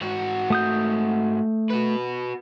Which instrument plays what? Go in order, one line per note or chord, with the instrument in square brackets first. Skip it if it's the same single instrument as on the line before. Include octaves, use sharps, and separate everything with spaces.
[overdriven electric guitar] G#2 F#4
[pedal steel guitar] A3 D#6 G6
[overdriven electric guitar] F#4 B4